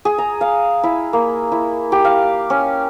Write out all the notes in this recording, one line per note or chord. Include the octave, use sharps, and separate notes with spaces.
G#4
A#5
F5
E4
A#3
E4
G4
F5
C#4